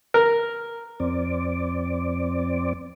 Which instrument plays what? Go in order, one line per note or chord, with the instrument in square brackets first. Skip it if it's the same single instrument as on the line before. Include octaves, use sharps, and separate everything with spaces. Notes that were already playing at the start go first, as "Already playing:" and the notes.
[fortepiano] A#4
[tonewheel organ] F2 C4 D5